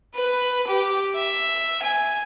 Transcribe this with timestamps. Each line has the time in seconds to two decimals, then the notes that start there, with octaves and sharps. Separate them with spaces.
0.15 B4
0.67 G4
1.16 E5
1.83 G#5